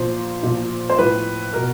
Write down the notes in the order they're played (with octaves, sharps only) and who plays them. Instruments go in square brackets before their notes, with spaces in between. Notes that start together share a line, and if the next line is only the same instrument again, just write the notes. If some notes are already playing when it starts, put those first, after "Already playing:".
Already playing: [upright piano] A#2 F3 C5
A#2 F3
C5
A2 F3 B4
B2 A#4